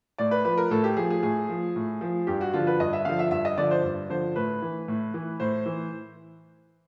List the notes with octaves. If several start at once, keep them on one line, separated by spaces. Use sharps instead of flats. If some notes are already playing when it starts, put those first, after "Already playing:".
A2 D5
B4
F3 B4
A#4
A2 A4
G4
F3 G#4
G#4
A2 G#4
F3
A2
F3
G2 G4
F#4
D3 F3 F4
B4
G2 D#5
E5
D3 F3 F5
E5
G2 E5
D#5
D3 F3 D5
C5
G2
D3 F3 C5
A2 B4
E3
A2
E3
A2 C5
E3